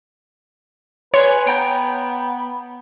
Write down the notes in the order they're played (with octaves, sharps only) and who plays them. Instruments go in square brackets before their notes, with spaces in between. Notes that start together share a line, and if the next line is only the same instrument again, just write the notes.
[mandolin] G#4 G#5 C6 [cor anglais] B4 [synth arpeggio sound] C#5
[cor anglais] B3 [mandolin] G5 A#5 G6